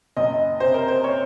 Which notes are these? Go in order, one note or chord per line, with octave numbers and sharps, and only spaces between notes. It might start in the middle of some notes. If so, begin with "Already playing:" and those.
F#1 D#5
C3 C5
A#4
C5
C#5